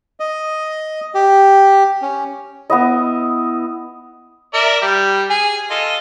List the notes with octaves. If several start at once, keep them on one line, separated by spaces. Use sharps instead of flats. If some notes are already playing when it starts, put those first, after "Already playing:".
D#5
G4
C#4
B3 E4 D#5
A#4 D5 E5
G3 G4
G#4 G#5
F4 A4 D#5